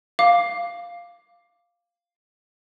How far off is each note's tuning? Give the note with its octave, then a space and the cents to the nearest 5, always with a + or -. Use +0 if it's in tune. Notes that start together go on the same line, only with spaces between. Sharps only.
F5 +0 D6 +0